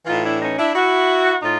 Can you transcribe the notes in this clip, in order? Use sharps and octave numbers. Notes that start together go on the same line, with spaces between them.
A2 E3 D#4 F4
D4 E4
C#4 D#4
D4 E4
E4 F#4
A2 D#4 F4